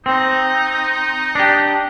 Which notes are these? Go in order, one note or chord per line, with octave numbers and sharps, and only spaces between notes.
C4 D#4
D4 G4